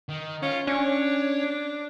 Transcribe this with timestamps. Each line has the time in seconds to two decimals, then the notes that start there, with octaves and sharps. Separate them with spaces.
0.09 D#3
0.42 C#4 F4
0.67 C#4 D4 C#5